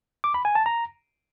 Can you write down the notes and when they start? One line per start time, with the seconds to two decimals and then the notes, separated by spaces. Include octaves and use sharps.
0.24 D6
0.34 B5
0.45 G#5
0.55 A5
0.66 A#5